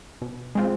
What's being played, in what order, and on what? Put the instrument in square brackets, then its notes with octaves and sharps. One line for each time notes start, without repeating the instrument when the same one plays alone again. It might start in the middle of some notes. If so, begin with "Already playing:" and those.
[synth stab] B2
G#3 C4 F4